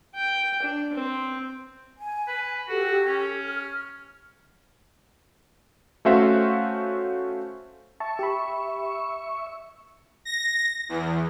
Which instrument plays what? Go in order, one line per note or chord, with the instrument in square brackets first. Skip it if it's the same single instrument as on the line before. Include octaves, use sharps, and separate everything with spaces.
[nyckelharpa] G5
D4
C4
[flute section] G#5
[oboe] B4
[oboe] F#4 [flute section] G4 A4
[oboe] C#4
[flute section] F6
[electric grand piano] A3 C#4 F#4 C5 E5 F5
[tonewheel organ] E5 C#6 [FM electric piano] A5
[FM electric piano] G4 B5
[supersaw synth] A#6
E2